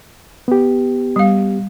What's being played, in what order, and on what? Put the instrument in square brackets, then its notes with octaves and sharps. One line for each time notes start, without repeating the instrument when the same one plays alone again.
[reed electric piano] B3 G4
[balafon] G3 F5